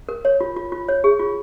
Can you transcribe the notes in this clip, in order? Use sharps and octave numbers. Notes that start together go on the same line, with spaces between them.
A#4
C#5
F4
F4
F4
C#5
G#4
F4